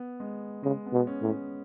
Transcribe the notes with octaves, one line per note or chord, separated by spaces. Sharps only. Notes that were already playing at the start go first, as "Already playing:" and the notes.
Already playing: B3
G#3
C#3 G#3
B3
B2
C#4
A2
C#4